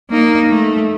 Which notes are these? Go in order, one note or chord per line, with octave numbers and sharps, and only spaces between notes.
A#3 D#4
A3